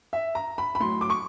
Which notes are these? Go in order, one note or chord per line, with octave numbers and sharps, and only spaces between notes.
E5
A#5
B5
B5
A2 F#3 C6
D6
C#6